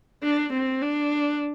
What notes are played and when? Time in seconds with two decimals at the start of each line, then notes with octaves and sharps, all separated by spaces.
0.23 D4
0.53 C4
0.82 D4